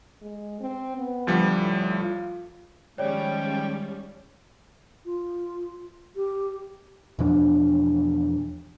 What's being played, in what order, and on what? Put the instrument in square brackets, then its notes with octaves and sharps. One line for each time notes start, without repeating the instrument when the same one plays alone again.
[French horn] G#3
C4
B3
[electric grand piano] D2 F3 G3
[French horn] A2
F4
[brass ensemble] D#3 G#3 [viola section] F3 G3 C#4 [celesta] C#5 D5 [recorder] G5
[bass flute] F4
G4
[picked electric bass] E2 B2 F3 D4